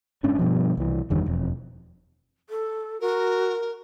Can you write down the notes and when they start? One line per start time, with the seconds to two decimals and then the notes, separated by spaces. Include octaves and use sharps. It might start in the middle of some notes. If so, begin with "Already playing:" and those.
0.23 F#1 G#2 C#4 D4
0.39 G2 B2 F3
0.77 C2 E3
1.10 G1 E2 G2 D#3
1.26 E1 F2
2.50 A4
3.01 F#4 A#4